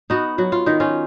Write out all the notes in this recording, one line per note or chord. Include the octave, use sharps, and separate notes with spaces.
B3 D#4 F#4
F#3 F#4
F4
D#3 D#4
C#4 F4